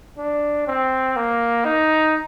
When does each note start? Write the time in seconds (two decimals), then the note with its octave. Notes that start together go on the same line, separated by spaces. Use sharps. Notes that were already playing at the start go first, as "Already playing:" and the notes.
0.18 D4
0.67 C4
1.16 A#3
1.65 D#4